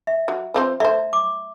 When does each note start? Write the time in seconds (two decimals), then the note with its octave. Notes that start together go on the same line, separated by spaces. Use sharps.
0.07 E5
0.28 F#3
0.54 F3 C4 C5
0.80 A3 C5 D5 E5
1.13 D6